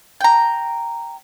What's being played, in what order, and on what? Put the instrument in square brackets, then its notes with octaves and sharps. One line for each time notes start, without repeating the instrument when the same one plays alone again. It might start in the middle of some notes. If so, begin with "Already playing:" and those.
[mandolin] G5 A#5